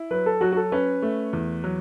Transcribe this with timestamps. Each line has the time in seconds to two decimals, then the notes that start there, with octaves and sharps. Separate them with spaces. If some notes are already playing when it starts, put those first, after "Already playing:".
Already playing: E4
0.11 F#3 B4
0.26 A4
0.41 F#3 F#4
0.52 F#4
0.57 A4
0.72 C#4 B4
1.02 A3
1.33 E2
1.64 F#3